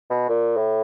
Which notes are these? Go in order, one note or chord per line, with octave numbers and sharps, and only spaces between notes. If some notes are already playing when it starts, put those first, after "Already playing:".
B2
A#2
A2